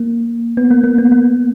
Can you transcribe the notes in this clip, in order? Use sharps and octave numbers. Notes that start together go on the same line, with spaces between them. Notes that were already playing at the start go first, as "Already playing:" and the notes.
Already playing: A#3
B3
A#3
A#3
B3
A#3